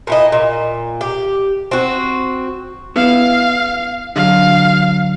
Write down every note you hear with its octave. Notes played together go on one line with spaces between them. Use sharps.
A#2 E4 D#5
A#2
G4
C4 F#4
B3 E4 F5
D3 F#3 F5